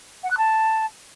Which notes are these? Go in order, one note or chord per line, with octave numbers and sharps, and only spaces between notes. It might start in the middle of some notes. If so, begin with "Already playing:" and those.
F#5
F#6
A5